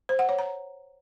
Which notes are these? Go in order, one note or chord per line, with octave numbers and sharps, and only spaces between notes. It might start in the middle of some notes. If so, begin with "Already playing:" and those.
C5
F#5
C#5
A#5